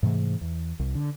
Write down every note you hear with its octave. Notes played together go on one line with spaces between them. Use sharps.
G#2 C3 E3 A3
E2
C2
D3